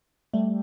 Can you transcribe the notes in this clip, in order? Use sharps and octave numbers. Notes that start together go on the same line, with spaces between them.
G3 A3